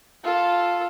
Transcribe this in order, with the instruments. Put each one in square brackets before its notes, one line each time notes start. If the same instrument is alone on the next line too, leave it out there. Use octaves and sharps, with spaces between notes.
[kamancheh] F4 A4